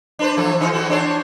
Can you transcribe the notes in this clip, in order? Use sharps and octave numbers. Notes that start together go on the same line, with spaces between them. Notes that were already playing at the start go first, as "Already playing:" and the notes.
D4 B4 C5
E3 F3 A3
E3 D#4 F4
E2 E3 F#4
D4 C5 C#5